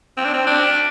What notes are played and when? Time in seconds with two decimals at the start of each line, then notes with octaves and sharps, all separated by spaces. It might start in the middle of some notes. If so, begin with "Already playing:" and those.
0.17 C4
0.25 D4
0.33 C4
0.47 D4